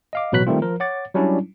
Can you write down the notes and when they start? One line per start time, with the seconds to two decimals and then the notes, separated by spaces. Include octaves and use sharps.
0.13 D#5 F5 D6
0.32 A1 B2 F#3 B4 F#6 B6
0.47 D#3 G3 A3 C4 F4
0.62 F3 A#4
0.80 C#5 F#5 D6 A6
1.15 F#3 G3 C#4 D4 E4